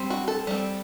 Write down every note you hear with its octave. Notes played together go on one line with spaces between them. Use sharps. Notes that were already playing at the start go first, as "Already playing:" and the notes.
Already playing: G3 C4
F#4
A4
G3 C4